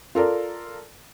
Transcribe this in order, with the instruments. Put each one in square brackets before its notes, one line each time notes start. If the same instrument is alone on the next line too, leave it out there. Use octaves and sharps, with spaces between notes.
[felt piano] F4 A4 A#4 D5